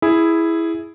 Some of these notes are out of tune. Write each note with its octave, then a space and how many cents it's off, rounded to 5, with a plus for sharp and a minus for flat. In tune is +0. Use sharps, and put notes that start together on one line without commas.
E4 +0 G#4 +0